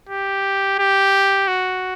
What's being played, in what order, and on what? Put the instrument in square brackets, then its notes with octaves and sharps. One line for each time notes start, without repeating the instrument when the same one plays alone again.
[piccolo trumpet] G4
G4
F#4